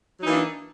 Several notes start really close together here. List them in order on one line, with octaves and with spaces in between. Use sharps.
F#3 D#4 E3 A#3 D4